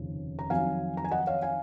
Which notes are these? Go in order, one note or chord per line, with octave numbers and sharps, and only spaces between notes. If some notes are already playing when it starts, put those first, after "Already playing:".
Already playing: F1 D#2 C#3 F3
A#5
F2 D#3 F#3 F5 G#5
A#5
G#5
D#5 F#5
C#5 F5
F5 G#5